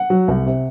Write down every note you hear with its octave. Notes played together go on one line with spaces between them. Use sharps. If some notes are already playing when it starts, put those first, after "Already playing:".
Already playing: F#5
F#3
C2
C3